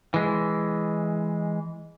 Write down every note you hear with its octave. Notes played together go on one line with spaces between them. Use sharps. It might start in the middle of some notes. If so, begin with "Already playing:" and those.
E3 G#3